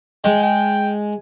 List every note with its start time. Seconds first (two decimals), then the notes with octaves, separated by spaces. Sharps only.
0.24 G#3 G5
0.43 G5